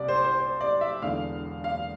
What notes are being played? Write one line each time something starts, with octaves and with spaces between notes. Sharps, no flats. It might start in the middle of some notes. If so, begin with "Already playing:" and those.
Already playing: C2 C3 G3 D5
C5
C5
C5
D5
E5
E1 E2 D3 F5
F5